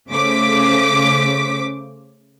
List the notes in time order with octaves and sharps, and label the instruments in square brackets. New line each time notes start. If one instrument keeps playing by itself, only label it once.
[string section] C#3 A3 C5 D6 B6